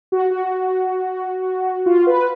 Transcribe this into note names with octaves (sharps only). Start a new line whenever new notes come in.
F#4
F#4
F4
B4